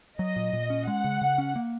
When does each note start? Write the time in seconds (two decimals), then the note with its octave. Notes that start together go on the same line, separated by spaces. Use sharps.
0.19 F#3 D#5
0.36 A#2
0.53 A#2
0.70 C#4
0.87 G#3 F#5
1.04 C#3
1.21 C#3
1.38 C#4
1.56 A#3